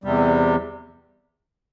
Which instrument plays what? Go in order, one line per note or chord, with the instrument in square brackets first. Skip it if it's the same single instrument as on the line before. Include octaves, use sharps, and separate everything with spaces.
[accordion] E2 C3 G3